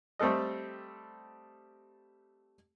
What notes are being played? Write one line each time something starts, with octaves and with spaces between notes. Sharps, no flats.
G3 A3 C4 A4 D#5